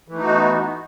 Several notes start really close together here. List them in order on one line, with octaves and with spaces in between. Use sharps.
E3 A3 D#4 F#4 B3